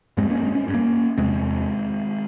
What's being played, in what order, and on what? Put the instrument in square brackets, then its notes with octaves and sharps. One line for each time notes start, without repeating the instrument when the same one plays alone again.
[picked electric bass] G2 G#3 C4
A#3 C#4
G#3 C4
C#4
G2
A#3 C#4
E2 C3 G#3 C4